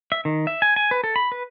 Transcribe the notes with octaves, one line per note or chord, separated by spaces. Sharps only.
E5
D#3
E5
G#5
G#5
B4
A4
B5
B4